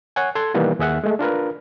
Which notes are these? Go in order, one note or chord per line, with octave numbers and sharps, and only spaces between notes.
C#5 F#5 G#5
A4 C6 G#6
B2 D#3 E3 G3 A#3 B3
D#2 G#4 E5 F#5
G#3 A3
D4 F4 A#4 B4